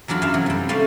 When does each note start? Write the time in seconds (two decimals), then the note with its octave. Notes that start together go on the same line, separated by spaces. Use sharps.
0.08 E2 F#3 D4 F4 B5
0.22 F#2 F4 E5 F5
0.34 C3 E3 F#3
0.46 G3 C4
0.69 G3 A3 C#4 C5 D5 F5